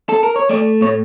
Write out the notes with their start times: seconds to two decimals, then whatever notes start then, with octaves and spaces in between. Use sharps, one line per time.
0.09 A4
0.23 A#4
0.36 C#5
0.49 A3 D5
0.81 A2 C#5